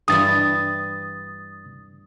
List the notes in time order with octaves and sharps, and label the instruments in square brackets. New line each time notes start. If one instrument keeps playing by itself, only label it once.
[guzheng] G2 E3 E4 [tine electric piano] D#6 A6